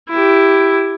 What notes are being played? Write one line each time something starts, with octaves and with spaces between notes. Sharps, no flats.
E4 G4